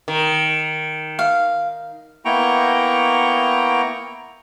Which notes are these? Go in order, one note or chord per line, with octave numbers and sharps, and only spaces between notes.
D#3
F5
A#3 B3 E4 G5 A#5 C#6